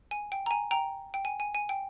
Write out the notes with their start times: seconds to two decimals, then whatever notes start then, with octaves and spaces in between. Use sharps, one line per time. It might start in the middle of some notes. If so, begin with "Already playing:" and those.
0.11 G#5
0.32 G5
0.46 A#5
0.51 G#5
0.71 G5 A#5
1.14 G5
1.25 G#5
1.40 G#5
1.55 G#5
1.69 G5